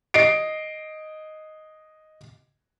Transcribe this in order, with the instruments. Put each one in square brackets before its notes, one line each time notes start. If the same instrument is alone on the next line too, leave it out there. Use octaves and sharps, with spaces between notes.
[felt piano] D#5 C7 D7